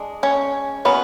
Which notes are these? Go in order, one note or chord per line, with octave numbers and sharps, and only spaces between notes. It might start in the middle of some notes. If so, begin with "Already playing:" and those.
Already playing: G#3 D4
C#4 C#5
F#3 B3 C#4 B4